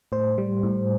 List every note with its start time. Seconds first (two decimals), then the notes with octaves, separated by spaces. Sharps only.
0.12 A2 C5
0.38 G3
0.63 A2